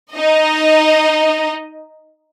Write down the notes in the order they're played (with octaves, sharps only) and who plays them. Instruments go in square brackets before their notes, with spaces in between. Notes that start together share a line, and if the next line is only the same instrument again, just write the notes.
[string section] D#4 D#5